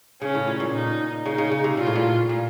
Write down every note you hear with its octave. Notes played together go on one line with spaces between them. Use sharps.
C#3 C#4
A2
A#2
A#2
D#4
C#3 D#4
C#3
C#3
C3
A#2 F4
A2
A#2
A#2